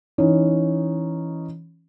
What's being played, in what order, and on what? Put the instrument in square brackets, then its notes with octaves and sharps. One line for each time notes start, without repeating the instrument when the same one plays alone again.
[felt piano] E3 C#4 D#4